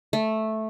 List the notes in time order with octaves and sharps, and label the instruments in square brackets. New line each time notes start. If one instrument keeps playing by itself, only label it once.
[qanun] A3